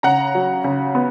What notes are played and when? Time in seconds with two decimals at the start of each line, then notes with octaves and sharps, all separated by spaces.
0.03 C#3 F#5 A#5
0.35 F#3
0.64 C#3
0.95 B3